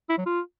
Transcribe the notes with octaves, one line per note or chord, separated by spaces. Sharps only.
E4
F#3
F4